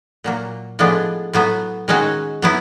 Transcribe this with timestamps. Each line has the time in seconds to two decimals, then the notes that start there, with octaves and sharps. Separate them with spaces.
0.24 A#2 F#3 A#3
0.79 A2 F3 G#3 B3 D4
1.33 A2 F#3 B3
1.88 D#3 G#3 C#4 F#4
2.42 F#3 B3 E4